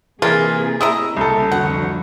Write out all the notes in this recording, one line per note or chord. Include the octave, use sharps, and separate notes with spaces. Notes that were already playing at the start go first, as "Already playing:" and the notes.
C3 E3 A#3 F4 G#4 A#4
G#3 E4 A#5 D#6 E6
C2 C#3 A#3 C#4 A4
F2 D3 F#4 F#5